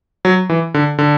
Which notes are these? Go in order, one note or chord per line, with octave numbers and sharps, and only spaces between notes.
F#3
E3
D3
D3